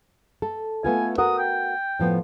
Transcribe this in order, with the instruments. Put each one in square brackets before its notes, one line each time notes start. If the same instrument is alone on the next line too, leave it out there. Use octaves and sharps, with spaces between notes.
[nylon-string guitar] A4
[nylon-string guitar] A3 B3 F4 [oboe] G#5
[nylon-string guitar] F#4 A#4 F#5 [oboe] D#6
[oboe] G5
[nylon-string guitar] A2 F3 B3